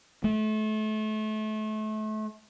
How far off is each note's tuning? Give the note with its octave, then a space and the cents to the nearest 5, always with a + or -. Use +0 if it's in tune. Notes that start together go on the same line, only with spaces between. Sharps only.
A3 -30